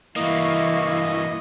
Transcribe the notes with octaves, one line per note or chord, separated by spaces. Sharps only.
G2 E3 A#3 E4 D#5 F5 C#6